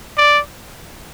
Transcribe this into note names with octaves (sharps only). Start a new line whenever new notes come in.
D5